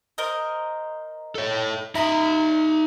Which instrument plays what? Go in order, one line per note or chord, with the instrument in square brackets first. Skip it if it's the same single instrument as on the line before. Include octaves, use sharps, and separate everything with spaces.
[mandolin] A#4 C5 D#5
[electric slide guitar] A4 C#5
[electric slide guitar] D#4 E5 [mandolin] A#5 C6 D#6